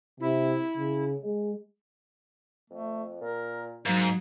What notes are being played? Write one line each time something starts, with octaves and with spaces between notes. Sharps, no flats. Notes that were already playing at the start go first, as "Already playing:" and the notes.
C3 E4
C#3
G#3
F2 A3
A#2 A#4
G#2 F#3 A#3 D#4